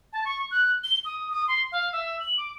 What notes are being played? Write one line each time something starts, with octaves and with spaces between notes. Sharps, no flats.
A5
C#6
F#6
G7
D#6
D#6
C6
F5
E5
F#7
D6